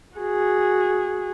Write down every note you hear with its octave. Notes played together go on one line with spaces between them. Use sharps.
F#4 G#4